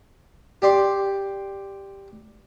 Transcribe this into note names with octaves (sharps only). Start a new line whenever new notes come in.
G4 D5 C6